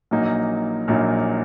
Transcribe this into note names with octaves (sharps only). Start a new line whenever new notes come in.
A#1 A#2 F#3 A#3 D#4
A#1 A#2 F#3 A#3 D#4